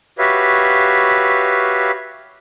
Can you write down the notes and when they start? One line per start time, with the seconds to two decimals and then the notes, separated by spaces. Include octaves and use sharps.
0.19 F#4 G4 B4 C#5 E5 F5